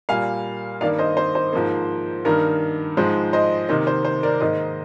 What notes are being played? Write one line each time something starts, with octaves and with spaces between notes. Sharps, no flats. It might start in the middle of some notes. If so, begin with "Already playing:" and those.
A#2 G3 A#3 F5 G#5
G2 D#3 A#3 D5 F5
C5 D#5
C5
C5
G#2 F3 A#3
G2 D#3 A#3 A#4
G#2 F3 G#3 C5
C5 D#5
C3 D#3 A#3 C5 D#5
C5
C5
A#4 D5
G#2 D#3 A#3 C5 D#5